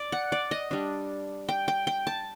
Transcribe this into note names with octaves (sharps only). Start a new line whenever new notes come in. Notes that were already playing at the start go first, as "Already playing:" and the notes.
Already playing: D5
F#5
D5
D#5
G3 D4
G5
G5
G5
A5